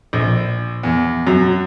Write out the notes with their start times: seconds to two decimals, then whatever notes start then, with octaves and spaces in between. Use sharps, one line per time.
0.13 A#1
0.83 E2
1.27 F#2